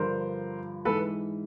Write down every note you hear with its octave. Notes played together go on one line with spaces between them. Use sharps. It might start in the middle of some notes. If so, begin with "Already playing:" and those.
Already playing: G2 D3 F3 A#4 C5
G#2 E3 A4 B4